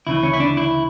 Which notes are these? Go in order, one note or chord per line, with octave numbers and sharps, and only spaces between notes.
D2 C#3 E3 E4
C#4
E4
D4
E4